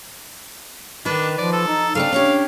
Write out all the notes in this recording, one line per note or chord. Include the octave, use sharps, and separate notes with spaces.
D#3 D4 D#4 B4
F3 D5
A4
D#4
C#3 A3 C4 D4 F5
C#4 D4 G4 C#5